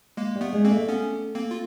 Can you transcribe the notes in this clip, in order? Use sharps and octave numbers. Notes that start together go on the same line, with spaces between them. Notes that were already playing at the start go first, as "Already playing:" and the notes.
G#3 A#3
G3
A3 B3
G#3
A#3 C4
A3
B3 C#4
A#3 C4
F4